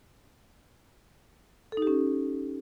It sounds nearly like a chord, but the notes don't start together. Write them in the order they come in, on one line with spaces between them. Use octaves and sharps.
A4 D#4 G4 C#4